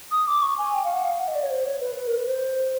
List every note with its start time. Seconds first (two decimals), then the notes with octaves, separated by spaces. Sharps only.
0.11 D#6
0.28 D6
0.42 C#6
0.58 G#5
0.74 G5
0.84 F5
0.94 F#5
1.04 F5
1.20 F#5
1.28 D#5
1.35 D5
1.43 C#5
1.50 C5
1.65 C#5
1.81 B4
1.96 B4
2.07 A#4
2.17 B4
2.27 C5